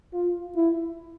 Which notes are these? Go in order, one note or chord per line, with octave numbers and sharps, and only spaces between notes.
F4
E4